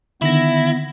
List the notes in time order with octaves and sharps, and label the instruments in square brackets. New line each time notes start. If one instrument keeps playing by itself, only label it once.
[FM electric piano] D3 D#3 A#6 [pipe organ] B3 [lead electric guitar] E4